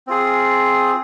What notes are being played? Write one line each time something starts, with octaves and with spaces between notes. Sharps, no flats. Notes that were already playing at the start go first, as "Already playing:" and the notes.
C4 F4 G#4